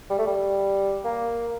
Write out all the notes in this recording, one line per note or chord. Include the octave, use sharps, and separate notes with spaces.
G3
A3
G3
A#3